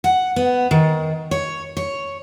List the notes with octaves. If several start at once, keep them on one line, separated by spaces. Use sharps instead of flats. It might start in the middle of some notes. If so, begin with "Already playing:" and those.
F#5
B3
D#3
C#5
C#5